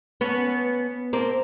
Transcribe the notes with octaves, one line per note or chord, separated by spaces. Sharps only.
B3 C#4
A#3 C4